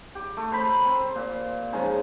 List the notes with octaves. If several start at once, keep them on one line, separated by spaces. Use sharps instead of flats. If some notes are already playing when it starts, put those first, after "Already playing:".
G4
A3
C5 A#5 B5
C4
A#2
F3 G#3 C#4 D#4